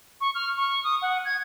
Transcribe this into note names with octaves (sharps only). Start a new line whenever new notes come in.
C#6
F6
C#6
D#6
F#5
G#6